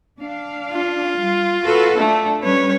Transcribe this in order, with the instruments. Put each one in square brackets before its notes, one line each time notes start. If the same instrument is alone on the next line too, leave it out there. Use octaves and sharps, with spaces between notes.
[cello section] D4 F5
[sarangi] F4
[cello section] G3
F#4 A4 B4
[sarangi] A3 [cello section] D4 E5
[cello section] G3 C#4 B4 [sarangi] C#5